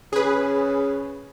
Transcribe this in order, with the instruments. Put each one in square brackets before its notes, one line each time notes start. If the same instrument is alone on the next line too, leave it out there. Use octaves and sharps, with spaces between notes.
[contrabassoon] C#3 [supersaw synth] G#4 B4